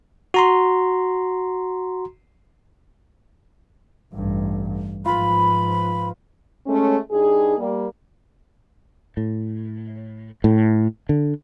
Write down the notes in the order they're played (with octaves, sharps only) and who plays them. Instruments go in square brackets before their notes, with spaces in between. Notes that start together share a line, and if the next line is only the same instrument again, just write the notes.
[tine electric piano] F#4 A#5 C6
[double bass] A1 G2
[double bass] G#2 F3 [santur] F4 B4 [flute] B5
[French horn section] G#3 A3 C#4
G2 D#4 G#4
G3 A#3
[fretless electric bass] A2
A2
D3